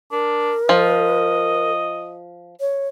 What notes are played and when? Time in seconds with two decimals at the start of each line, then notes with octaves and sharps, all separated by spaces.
0.12 D4 A#4
0.69 F3 D#5
2.60 C#5